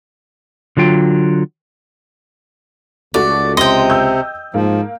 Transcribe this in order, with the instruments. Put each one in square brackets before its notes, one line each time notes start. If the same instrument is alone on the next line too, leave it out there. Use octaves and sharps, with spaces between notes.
[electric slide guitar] D3 F#3 F4 G5
[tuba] C#2 [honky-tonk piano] A3 F#4 [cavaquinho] D5
[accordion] C3 [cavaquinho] D#5 G5 [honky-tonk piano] C6
[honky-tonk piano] E6 G6
[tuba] G#2 [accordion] F3 [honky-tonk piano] A#3